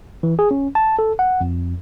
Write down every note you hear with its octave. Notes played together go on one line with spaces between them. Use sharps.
E3
G#4
C#4
A5
A4
F#5
F2